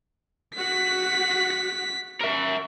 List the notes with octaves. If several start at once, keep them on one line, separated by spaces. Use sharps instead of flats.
F#4 F#5 B6
A#4 E5